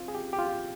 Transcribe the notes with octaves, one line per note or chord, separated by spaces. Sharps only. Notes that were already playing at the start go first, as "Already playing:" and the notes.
Already playing: C4 F4
G#4
G4
G4
F4